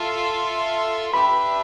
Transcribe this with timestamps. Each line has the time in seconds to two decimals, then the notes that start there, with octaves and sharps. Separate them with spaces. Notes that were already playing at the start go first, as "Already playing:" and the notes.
Already playing: F4 A4 E5
1.14 D4 G4 B4 E5 B5